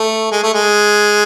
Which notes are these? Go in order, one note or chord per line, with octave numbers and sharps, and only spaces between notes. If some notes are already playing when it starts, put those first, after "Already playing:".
Already playing: A3
G#3
A3
G#3